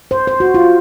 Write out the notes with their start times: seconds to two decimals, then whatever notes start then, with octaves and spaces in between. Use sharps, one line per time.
0.11 C5
0.28 C5
0.40 F#4
0.54 F4